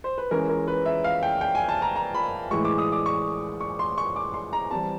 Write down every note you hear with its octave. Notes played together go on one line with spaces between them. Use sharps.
C5
B4
E3 G#3 C#4 A#4
A#4
B4
E5
F5
G5
G5
G#5
A5
A#5
A#5
B5
A2 E3 G#3 C#6
D6
D#6
D6
C#6
C#6
C6
C#6
D6
C6
A#5
E3 G3 C4 A5